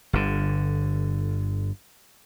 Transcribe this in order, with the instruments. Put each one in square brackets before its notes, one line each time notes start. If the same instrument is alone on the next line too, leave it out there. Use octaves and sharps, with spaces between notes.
[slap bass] G1 D3